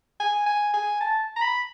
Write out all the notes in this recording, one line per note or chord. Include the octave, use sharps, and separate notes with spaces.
G#5
G#5
G#5
A5
A#5
B5